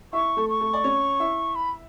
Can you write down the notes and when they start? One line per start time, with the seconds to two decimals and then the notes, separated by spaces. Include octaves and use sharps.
0.13 E4 E5 C#6
0.37 A3 A4
0.49 C#6
0.60 A3 A4
0.73 D5
0.84 C#4 C#5
1.20 E4 E5
1.55 B5